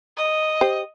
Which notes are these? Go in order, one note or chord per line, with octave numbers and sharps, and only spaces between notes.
D#5
G4 C5